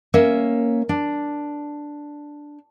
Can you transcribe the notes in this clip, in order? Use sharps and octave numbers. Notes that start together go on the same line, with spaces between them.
A#3 C#4 A#4 E5
D4